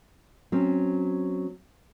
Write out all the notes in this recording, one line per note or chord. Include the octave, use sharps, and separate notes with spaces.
F#3 C4 C#4